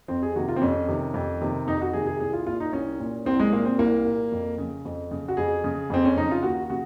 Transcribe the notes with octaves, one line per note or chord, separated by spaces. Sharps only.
F2 C4
G#4
C3 D#3 F#4
F4
C4
F2 C#4
C3 D#3
F2
C3 D#3
F2 D#4
F#4
C3 D#3 G#4
G#4
C2 G#4
F4
A#2 F4
D#4
C2 C#4
A#2
C2 C4
G#3
A#2 A#3
C4
C2 A#3
A#2
F2
C#3
F2
C#3
F#4
F2 G#4
C#3
F2 C4
C#4
C#3 D#4
F4
D#2 F#4
C#3 F#4